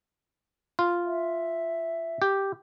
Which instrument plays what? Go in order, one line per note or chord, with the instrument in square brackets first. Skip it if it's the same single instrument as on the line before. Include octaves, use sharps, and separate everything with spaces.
[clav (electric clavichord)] F4
[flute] E5
[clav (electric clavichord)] G4